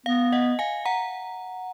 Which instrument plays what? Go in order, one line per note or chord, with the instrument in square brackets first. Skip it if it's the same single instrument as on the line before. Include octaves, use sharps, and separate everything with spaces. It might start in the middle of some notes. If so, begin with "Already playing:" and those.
[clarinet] B3 [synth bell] F5
[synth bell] D#5 F#5
F5 G#5
F#5 A#5